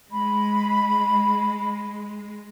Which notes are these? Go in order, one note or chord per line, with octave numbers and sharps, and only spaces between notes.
G#3 B5